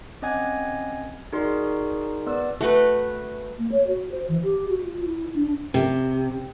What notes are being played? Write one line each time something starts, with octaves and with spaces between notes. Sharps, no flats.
C4 C#4 D#5 F#5 G#5 G#6
D#4 F#4 G#4 A#4 D5 C6
B3 B4 D5 E6
A3 F#4 B4
A#3
C#5
F#4
C5
E3
G4
F#4
F4
E4
D4
C3